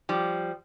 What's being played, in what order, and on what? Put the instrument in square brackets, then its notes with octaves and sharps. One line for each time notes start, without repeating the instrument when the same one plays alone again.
[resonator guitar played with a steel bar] F3 G3